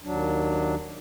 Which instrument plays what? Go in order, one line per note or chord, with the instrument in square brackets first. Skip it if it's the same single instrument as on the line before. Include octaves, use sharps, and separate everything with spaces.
[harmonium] D#2 F#3 D4